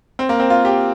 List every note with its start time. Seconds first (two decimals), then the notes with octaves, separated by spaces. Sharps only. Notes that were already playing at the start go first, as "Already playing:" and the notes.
0.19 C4
0.29 A#3
0.40 C4
0.50 F4
0.65 G4